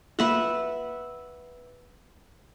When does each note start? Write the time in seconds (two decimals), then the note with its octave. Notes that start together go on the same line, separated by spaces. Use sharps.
0.19 A#3 F4 B4 E5 F#5